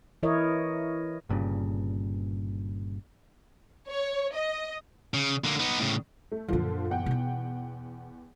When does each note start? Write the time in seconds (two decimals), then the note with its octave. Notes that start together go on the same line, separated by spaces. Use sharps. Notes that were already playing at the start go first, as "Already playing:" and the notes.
0.23 E3 E4 A#4 C#5 D#5
1.29 G1 G2 A#2 C#3
3.90 C#5
4.35 D#5
5.14 C#3
5.44 D3 A#3
5.59 B3 D#4
5.79 A2 C#3
6.32 A3
6.48 F#2 A#2 D3 F3 F4
6.90 E2 F#5 G5
7.06 B2 D#4